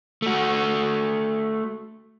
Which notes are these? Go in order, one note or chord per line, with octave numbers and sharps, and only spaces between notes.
A3 F#4